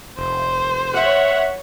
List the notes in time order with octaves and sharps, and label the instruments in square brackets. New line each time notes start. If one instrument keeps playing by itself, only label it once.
[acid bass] F1 [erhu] C5
[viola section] C#5 F#5 [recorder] E5